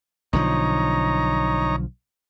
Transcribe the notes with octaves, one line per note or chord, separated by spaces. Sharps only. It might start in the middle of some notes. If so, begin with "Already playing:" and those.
B1 D3 F3 D#4 C#5 A#5